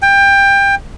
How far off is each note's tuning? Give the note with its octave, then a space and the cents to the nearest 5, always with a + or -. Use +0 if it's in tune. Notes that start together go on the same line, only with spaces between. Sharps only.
G5 +25